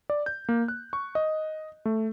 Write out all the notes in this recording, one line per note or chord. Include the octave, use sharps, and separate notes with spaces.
D5
G6
A#3
F#6
C#6
D#5
A3